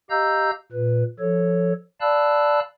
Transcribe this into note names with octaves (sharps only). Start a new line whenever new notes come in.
G4 D#5 F5 A#5 E6 G6
A#2 B4
F3 A4 C#5
D5 F5 A5 B5 E6 F#6